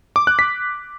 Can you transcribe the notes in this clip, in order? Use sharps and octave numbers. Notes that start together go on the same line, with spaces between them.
D6
F#6
B6